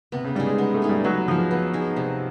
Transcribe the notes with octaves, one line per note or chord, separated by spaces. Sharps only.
C3 B3
C#3
G3 D#4 G#4
G#3
B3
A3
D#4 G#4
G3
F#3 B3
F3 D#4 G#4
B3
D#4 G#4
C3